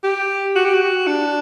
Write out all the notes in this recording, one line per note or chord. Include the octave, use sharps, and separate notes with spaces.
G4
F#4
G4
F#4
D4